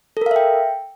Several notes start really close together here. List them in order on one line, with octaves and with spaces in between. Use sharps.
A4 A#4 F5 E5 G5